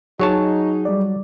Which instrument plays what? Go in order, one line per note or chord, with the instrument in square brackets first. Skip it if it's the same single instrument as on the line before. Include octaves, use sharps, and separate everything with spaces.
[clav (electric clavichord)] F#3 C#5 A5 [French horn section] D#4 [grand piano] G#4
[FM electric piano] G3 D5